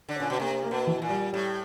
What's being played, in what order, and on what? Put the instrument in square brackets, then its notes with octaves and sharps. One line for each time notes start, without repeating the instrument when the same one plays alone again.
[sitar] D3
[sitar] A#2 [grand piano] C#4
[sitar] B2
[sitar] C3 [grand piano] A#3
[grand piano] A#3
[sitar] B2
[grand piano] E3
[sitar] A#2
[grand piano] G3
[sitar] A2 [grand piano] G3